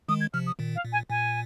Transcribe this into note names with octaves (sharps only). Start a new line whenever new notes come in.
D#3 G#3 D#6
G#6
C3 F3 F6
D#6
A#2 D#3
F5
A#2
G#5
A#2 G#5